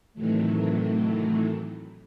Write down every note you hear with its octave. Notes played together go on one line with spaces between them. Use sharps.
A2 C3 D#3 E3 F#3 A3